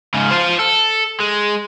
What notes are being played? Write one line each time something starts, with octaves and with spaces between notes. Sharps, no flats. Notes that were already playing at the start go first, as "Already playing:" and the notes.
G#2 C#3
F4 C5
A4
G#3